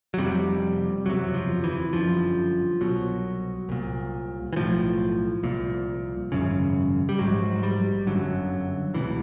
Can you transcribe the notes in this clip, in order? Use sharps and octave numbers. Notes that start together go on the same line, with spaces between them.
F#3
F1 F2 C3 G3
F#1 E2 C3 F#3
F3
E3
G1 F#2 D3 F3
C2 B2 F#3
C2 A#2
E3
B1 A2 F3
C2 A#2
G#1 F#2 C#3
G3
A#1 G#2 F#3
G3
G1 F#2 D3 F#3
E1 D2 C3 E3